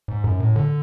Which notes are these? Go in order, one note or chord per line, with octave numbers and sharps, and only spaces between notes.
G#2
F#2
A2
D3